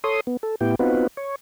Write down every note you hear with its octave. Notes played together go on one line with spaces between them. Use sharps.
A4 C#5 C6 D#6
B3
A4
A2 B3 E4 G4 G5
B3 C4 D#4 F4 F#4 B4
C#5